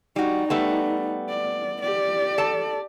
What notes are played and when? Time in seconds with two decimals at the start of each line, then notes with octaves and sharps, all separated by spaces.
0.16 G3 D#4 F#4
0.50 G3 A3 B3
1.29 D5
1.82 G4 D5
2.38 A4 A5